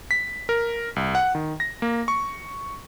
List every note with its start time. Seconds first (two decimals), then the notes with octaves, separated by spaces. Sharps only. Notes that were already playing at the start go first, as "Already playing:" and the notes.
0.11 B6
0.49 A#4
0.96 C2
1.15 F#5
1.35 D#3
1.60 A#6
1.82 A#3
2.08 C#6